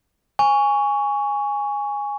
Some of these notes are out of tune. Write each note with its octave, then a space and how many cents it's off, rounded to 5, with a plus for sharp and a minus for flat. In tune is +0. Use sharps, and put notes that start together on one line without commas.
G#5 -10 C#6 +15